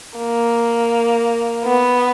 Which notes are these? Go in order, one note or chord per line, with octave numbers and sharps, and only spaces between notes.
A#3
B3